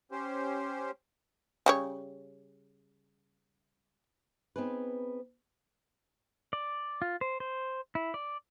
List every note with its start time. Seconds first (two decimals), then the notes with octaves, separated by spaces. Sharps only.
0.12 C#4 G4 C5
1.66 C#3 G3 C#5
4.56 B3 C4 D#4 G#4 B4
6.53 D5
7.02 F4
7.21 C5
7.40 C5
7.95 E4
8.14 D5